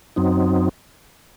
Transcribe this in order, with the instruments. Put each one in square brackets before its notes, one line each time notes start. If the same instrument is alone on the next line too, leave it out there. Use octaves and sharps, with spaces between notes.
[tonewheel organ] F#2 F#3 C4 D#4